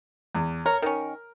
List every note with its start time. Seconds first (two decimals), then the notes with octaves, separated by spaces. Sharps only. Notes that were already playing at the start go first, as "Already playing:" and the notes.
0.35 E2
0.66 A#4 C#5
0.82 D#3 C#4 A#4